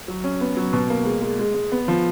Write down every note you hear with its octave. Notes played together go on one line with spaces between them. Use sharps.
F#3
C#4
B3
F#3
B2
A#3
G#3
G#3
G#3
G#3
B3
F3